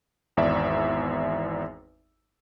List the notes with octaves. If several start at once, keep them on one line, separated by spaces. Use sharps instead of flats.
G#1 E2 D5 E5